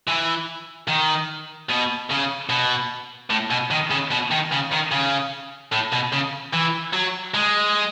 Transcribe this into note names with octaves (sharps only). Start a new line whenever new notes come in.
E3
D#3
B2
C#3
B2
A2
B2
D#3
C#3
B2
D#3
C#3
D#3
C#3
A2
B2
C#3
E3
F#3
G#3